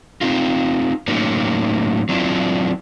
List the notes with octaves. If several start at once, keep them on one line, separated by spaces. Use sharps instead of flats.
C4 D#4 F4
A2 F#3 A#3 C#4 D#4
F#3 C4 D4 E4 F4